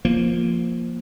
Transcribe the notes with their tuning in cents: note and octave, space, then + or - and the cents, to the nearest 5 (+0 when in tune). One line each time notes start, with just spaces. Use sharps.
F3 +0 A#3 +0